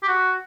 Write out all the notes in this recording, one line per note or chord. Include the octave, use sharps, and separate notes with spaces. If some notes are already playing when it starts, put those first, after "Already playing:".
G4
F#4